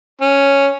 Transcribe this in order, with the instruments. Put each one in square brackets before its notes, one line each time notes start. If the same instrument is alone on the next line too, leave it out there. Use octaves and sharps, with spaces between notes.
[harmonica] C#4